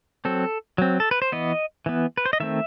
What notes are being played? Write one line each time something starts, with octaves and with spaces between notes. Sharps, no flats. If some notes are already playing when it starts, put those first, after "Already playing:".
F#3 C4 A4
F#3 C4
A4
B4
C5
E3 B3 D#5
E3 B3
B4
C5
D#5
D#3 A3 C4 E5